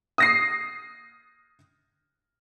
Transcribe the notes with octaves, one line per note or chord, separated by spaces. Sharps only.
D#6 A#6 C7